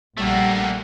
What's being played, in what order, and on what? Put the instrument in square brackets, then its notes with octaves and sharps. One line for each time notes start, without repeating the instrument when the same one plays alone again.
[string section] A#1 D4 F#5 [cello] G3 [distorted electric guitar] A3 A#3